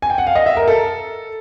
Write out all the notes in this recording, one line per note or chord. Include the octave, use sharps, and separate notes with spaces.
G#5
G5
F#5
F5
D#5
E5
A#4
A4